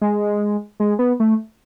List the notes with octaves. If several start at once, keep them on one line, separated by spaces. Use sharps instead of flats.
G#3
G#3
B3
A3